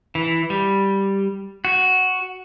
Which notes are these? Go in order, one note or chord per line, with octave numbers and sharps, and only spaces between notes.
E3
G3
F#4